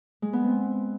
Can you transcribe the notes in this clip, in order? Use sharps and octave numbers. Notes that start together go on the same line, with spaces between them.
G#3
B3
C4